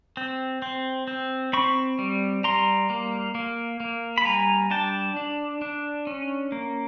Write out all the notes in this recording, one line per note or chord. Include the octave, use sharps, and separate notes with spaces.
C4
C4
C4
C4 B5 C#6
G3
G3 A#5 C6
A#3
A#3
A#3
B5
G3 G#5 A#5
D4 G5 A5
D4
D4
C#4
A#3